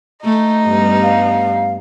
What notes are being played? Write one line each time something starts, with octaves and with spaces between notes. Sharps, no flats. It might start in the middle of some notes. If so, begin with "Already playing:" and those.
A3 D#4
G2 G3 B3
F5